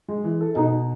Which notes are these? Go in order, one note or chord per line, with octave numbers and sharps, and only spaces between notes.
G#3
E3
A4
B2 D#4